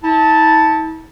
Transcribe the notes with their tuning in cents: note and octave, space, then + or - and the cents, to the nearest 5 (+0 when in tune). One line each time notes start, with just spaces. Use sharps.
E4 -45 A5 +0